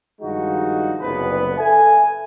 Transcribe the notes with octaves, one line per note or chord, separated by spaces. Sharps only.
G2 D#3 F3 G#3 D#4 F#4
F#1 C2 B3 B4
A4 E5 G#5